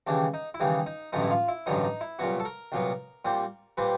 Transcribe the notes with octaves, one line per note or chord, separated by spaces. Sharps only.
D#2 C#3 E3 G3 D4
D#4
E4
D#2 C#3 E3 G3 D#4
D#4
A1 G2 D3 F#3 B3 D#4
E4
F4
E4
A1 G2 D3 F#3 B3 D#4
D#4
E4
C2 A#2 F#3 B3 F#4
A4
A#4
C2 A#2 F#3 B3
A#2 G3 C4
A#2 G3 C4 B4